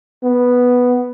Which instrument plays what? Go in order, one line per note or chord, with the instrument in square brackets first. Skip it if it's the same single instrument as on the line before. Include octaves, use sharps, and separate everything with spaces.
[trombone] B3